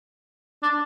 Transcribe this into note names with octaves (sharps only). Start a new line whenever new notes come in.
D4